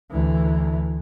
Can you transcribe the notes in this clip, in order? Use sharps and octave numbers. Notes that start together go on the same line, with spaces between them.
D2 E3